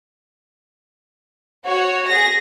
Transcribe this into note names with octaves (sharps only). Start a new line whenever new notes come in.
F#4 C#5
G#4 A#6